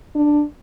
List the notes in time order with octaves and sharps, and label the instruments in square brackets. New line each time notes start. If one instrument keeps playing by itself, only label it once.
[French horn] D4